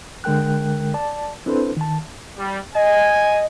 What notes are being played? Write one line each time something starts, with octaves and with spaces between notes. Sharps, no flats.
D3 G#3 A#4 G5 F#6
D5 A5
C4 D4 E4 A4 B4 C5
D#3 A5
G3
D#5 G#5